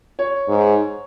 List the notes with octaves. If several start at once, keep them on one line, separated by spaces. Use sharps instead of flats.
C#5
G#2